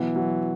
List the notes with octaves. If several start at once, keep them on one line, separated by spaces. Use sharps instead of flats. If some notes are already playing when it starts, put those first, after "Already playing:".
Already playing: B2 E3 F#3
F#3